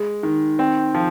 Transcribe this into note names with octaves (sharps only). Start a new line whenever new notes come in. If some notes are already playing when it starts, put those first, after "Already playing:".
Already playing: G#3
D#3
C4
F3